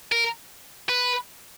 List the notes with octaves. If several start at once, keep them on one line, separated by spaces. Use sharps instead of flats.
A#4
B4